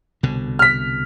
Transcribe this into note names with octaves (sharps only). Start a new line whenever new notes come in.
C2 B2 D3
F6 B6